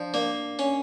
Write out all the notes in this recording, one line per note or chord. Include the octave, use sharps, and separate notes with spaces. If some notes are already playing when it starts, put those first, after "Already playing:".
Already playing: F3 D4 D5
A#3 D4 D5
C#4